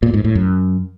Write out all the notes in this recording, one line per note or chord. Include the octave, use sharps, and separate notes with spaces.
A#2
G#2
A2
F#2